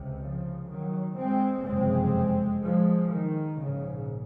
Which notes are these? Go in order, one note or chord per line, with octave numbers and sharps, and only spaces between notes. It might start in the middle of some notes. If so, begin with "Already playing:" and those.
Already playing: C#2 C3
C#3 F3
D#3 F#3
G#3 C4
F#1 F2 C3 G#3 C4
F3 G#3
D#3
A#1 G#2 C#3